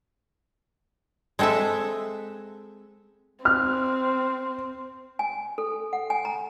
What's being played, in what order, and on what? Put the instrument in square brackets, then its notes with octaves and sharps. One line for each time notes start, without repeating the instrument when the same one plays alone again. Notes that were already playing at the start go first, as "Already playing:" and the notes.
[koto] G#3 C4 A4 B4 E5
[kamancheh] C4 [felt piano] F6
[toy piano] G#5
A4
F#5
G#5
A#5